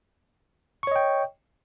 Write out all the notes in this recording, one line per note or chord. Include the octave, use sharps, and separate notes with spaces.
C#5 D#5 G5 C#6